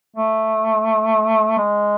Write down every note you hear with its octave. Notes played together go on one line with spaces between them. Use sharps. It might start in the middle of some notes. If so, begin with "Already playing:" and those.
A3
G#3